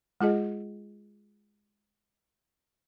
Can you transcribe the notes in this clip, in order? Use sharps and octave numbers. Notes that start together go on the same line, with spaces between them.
G#3 F4 G#4 D#5